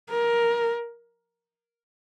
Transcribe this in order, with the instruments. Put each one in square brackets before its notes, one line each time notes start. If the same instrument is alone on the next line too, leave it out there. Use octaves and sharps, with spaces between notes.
[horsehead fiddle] A#4